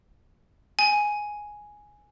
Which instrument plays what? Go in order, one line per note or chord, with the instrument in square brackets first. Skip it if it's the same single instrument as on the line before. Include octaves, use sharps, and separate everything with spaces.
[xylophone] G#5